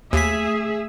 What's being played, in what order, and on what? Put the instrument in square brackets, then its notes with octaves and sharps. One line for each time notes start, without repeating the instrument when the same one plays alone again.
[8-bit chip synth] D#2 B6 [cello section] A3 G#4 E5